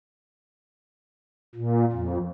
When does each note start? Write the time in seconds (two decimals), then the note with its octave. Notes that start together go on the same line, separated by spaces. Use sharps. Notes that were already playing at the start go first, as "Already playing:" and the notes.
1.55 A#2
1.92 F2